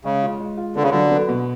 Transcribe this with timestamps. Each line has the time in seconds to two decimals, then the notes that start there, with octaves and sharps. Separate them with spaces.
0.04 C#3 G#3
0.23 F4
0.40 G#3
0.58 F4
0.76 D3 B3
0.83 C#3
0.90 D3 F#3
1.11 B3
1.29 B2